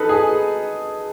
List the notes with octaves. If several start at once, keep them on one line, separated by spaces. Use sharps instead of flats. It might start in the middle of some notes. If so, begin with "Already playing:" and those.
Already playing: D#4 A4 B4
G#4